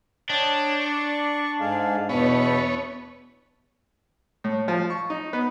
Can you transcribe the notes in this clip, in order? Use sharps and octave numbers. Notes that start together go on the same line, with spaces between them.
D4 C#5 D#5 G5
D5 C#6
G#2 G#3 G#4 A4 F5
E2 B2 B3 C#5 E5 A5 B5
A2
F3
C#6
D#4
B3